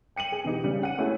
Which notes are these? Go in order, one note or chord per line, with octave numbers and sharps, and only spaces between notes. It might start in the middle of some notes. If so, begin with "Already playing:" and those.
G5 C#7 D#7 F#7
G#4
B2 E3 D#4 G4
C#3 G3
F#5 D#7
A3 C#4 E4 F#4 G#4